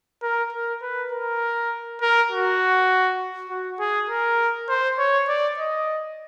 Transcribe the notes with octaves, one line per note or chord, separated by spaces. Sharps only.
A#4
A#4
B4
A#4
A#4
F#4
F#4
G#4
A#4
C5
C#5
D5
D#5